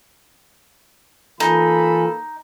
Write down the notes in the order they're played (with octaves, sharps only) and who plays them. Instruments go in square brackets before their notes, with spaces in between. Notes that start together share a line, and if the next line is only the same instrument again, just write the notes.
[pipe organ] E3 F4 G#5 [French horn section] A#3 A4 [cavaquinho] D#4 [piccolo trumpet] B5